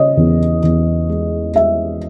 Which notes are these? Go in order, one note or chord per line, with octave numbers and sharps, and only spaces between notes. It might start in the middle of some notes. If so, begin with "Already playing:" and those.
Already playing: C#3 C#5 D#5
E2
E2
G#3
G#3 E5